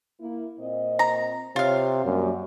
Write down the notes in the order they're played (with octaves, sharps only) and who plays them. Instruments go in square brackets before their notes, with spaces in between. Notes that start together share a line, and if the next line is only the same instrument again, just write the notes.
[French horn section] A#3 E4
A#2 C4 D#5
[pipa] A#5
[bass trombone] C3 [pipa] F4 F5 [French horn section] C#5
[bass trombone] F#2 [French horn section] G3 A#3